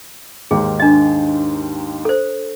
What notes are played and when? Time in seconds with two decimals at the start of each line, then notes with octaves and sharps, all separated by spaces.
0.51 D#2 G#2 D#3 G#4
0.80 D4 D#5
2.05 A4 C5